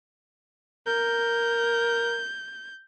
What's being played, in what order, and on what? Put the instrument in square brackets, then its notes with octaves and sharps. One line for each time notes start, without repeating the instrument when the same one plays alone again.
[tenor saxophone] A#4 [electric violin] G6